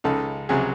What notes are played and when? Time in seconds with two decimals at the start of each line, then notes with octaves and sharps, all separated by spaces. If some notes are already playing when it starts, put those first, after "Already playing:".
0.04 C#2 C#3 G#3 D#4 A4
0.49 C#2 C3 F#3 G#4